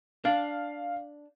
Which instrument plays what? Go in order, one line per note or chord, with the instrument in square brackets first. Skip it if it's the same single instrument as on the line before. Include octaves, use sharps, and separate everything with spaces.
[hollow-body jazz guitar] D4 [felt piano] F5